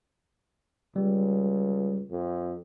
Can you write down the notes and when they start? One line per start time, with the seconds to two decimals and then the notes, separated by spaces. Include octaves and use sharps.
0.96 C#2 G3
2.10 F2